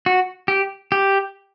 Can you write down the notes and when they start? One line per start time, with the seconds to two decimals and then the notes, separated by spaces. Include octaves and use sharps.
0.06 F#4
0.48 G4
0.92 G4